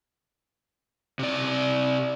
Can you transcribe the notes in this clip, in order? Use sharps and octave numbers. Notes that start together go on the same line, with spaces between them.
C3 D5